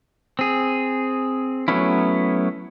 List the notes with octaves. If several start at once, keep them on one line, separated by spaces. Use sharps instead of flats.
C4 G#4
F#3 A3 B3 C#4 E4